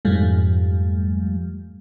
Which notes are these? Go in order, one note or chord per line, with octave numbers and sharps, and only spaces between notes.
F2 G#2 F3 G3 A3